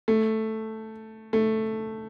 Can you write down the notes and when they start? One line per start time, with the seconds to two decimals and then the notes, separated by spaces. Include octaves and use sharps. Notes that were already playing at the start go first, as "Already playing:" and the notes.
0.08 A3
1.33 A3